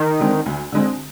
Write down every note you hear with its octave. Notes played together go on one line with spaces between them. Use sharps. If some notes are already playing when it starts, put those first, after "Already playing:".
Already playing: D#3
D3 G#3 C4
D2
D3 G#3 C4